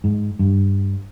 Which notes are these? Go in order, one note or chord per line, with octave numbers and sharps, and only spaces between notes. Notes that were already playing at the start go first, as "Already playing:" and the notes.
G#2
G2